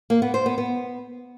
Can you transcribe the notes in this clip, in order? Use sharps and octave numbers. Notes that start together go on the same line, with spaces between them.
A#3
B3
C5
B3
B3